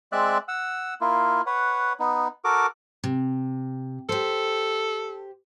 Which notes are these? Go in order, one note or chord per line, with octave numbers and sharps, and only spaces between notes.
G#3 C4 D5 E5 F#6
F#5 E6
A#3 E4 F4
B4 C#5 F#5
B3 D#4
F#4 A4 A#4 D6
C3
G4 A4 C5